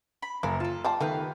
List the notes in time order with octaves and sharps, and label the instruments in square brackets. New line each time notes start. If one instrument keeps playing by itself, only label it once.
[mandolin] B5
[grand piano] F#1 [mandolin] A#4 E6 [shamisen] F5
[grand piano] F4 [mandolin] A4 A5
[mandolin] C5 D5 [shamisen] F5 G5 A5
[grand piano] D#3 [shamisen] A3 B3 [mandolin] G4 B4 F5